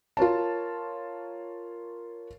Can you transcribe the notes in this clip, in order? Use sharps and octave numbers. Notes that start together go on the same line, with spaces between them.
F4 A#4 C#5 A5